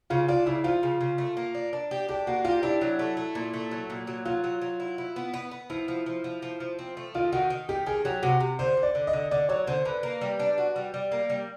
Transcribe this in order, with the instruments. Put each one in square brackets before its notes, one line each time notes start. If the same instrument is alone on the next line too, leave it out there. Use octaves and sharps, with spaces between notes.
[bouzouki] C#3 [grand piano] F4
[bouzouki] D4 [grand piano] F4
[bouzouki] C#3 [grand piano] E4
[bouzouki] F3 [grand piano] F4
[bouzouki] C#3
C#3
A3
A#3
D4
D4
G4
[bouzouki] D4 [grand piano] G4
[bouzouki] A#3 [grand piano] F#4
[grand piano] F4 [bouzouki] G4
[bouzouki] D4 [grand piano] E4
[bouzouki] F#3
A3
A3
A#2
A3
F#3
A#2
F#3
[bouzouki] F#3 [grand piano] F4
[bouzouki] F#3
F#3
E4
E4
B3
B3
B3
[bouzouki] F3 [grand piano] E4
[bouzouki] F3
F3
F3
F3
F3
C4
A3
[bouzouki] D#3 [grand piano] F4
[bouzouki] D#3 [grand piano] F#4
[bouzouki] D#3
[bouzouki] D#3 [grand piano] G4
[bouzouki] D#3 [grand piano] G#4
[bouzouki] F#3 [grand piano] G4
[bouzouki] C3 [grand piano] F#4
[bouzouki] C3
[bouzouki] D3 [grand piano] C5
[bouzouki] D3
[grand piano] D5
[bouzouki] D3
[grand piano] D#5
[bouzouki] D3
[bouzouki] D3 [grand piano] D5
[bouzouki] F#3 [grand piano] C#5
[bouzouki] D3 [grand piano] C5
[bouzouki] D3 [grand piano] B4
[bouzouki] A#3
G3
D4
F#4
G3
G3
A#3
G3